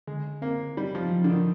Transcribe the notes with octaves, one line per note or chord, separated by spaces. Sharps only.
D3 G#3
A#3 C4
G3 D#4
F3
F3
D3
D#3